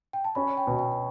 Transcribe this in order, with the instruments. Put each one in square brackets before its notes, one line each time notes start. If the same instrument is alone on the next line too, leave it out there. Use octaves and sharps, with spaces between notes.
[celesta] G5
A5
[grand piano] C#4 [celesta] B5
[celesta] G5
[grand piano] B2
[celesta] G5